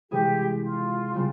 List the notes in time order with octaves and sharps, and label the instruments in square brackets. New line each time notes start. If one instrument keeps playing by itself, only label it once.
[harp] C3 E3 G#3 E4 G#4 [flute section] G4
[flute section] F4
[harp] C#3 G3 C4